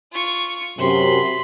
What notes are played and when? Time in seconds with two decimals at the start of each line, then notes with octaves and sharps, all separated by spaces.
0.12 F4 C#6
0.78 F#2 C3 B5 C6